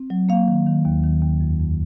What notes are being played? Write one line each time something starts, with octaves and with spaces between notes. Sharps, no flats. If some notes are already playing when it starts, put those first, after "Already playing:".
Already playing: C4
F#3
A#3 F5
D#3
D#3
D#2
D#3
D#2
F2
F2